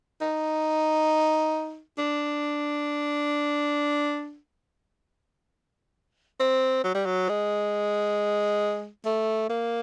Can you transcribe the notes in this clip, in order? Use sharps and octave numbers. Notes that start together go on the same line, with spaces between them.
D#4
D4
C4
F#3
G3
F#3
G#3
A3
A#3